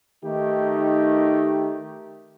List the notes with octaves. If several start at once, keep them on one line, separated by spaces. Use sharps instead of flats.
D#3 A3 D#4 G4